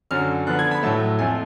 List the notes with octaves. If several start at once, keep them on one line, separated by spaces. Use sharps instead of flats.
F#2 D3 F#3 F6
D3 F3 B3 F#6
G#6
B5
A2 F#3 A3 A5
F2 F3 A3 G#5